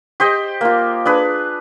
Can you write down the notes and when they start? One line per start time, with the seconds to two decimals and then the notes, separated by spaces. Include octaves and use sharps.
0.20 G4 C5 D#5
0.61 A#3 F4
1.05 D4 G#4 B4